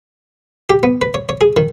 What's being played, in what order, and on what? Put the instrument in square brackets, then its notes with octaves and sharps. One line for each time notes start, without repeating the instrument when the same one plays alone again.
[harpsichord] G4
B3
B4
C#5
C#5
G#4
D#3